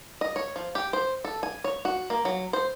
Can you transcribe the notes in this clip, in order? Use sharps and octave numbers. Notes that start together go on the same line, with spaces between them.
D#5
C#5
F3
G4
C5
A4
G#5
C#5
F#4
A#3
F#3
C5